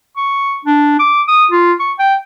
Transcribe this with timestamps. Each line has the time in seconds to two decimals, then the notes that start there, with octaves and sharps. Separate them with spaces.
0.17 C#6
0.65 D4
0.99 D6
1.28 D#6
1.51 F4
1.80 C#6
1.99 G5